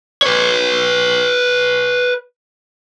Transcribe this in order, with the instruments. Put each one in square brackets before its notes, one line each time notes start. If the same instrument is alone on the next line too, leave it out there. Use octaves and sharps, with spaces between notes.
[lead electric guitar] B4 C#5